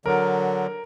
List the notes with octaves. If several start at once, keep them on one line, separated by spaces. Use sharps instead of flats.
D3 F#3 A#4